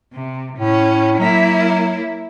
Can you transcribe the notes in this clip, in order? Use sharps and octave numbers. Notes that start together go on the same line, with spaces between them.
C3
A2 C#4
F#3 A#3 E4